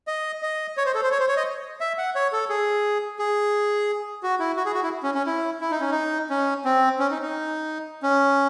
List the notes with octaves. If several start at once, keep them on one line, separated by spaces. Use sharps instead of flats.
D#5
D#5
C#5
C5
A4
C5
C#5
C5
C#5
D#5
E5
F#5
C#5
A4
G#4
G#4
F#4
E4
F#4
G#4
F#4
E4
C#4
C#4
E4
E4
D#4
C#4
D#4
C#4
C4
C#4
D#4
D#4
C#4